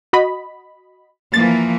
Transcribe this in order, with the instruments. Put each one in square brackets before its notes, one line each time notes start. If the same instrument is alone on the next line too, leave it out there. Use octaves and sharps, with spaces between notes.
[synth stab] F#4 D#5 B5
[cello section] E3 F3 A#3 [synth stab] A6